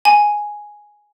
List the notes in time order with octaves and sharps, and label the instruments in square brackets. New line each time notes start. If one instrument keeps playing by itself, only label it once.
[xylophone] G#5